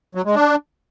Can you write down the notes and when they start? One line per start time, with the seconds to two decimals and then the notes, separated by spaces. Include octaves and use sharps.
0.15 F#3
0.25 G#3
0.35 D4